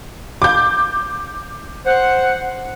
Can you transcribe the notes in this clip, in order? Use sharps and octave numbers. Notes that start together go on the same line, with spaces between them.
D6 G6
C5 F#5